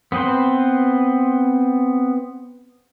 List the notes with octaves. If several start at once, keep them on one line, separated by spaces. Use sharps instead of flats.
B3 C4 B4 C5